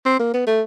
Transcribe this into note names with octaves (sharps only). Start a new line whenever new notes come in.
C4
A#3
B3
A3